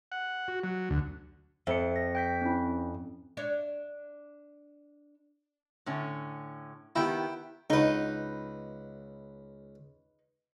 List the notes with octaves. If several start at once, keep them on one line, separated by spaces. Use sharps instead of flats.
F#5
F#4
F#3
D2
F2 E5 C#7
A#6
G5 G6 B6
C4 C#4 E4
D4 C#5 D5
A2 D3 C#4
D#3 B3 E4 G4 G5
C#2 D#4 B4 F#5